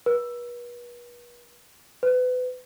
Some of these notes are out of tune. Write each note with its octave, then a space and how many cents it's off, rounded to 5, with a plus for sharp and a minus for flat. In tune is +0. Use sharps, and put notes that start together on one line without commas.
B4 -40
B4 +30